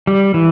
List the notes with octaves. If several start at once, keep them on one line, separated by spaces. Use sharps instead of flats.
G3
E3